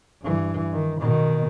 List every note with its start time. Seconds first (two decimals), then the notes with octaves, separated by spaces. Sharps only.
0.22 G2 E3
0.72 D#3
1.01 B2 D#3